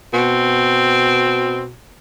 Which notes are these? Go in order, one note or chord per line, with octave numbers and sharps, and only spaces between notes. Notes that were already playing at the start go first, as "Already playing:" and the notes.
B2 C4